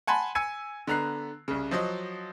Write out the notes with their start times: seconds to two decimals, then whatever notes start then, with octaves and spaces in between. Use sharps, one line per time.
0.07 F#5 G#5 A5 B5 C6
0.35 G#5 E6 G#6 C#7 D#7
0.87 D3 B3 A#5 F#6 C7
1.48 C2 C#3
1.71 F3 F#3 C5 D#5